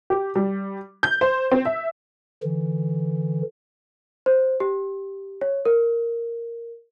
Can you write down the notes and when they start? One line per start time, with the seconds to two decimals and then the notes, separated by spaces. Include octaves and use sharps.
0.10 G4
0.36 G3
1.03 G6
1.21 C5
1.52 C4
1.65 E5
2.43 D3 E3
4.26 C5
4.60 G4
5.41 C#5
5.65 A#4